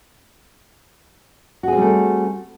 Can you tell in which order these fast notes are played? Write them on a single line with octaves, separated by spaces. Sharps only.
F#4 G#4 C4 G3 A3